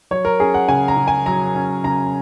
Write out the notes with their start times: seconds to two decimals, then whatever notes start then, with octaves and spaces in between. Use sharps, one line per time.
0.11 F#3 C#5
0.25 A#4
0.40 C#4 G#4
0.54 F#5
0.68 C#3 G#5
0.88 A#5
0.97 C#3
1.08 G#5
1.26 F#3 A#5
1.55 C#4
1.84 C#3 A#5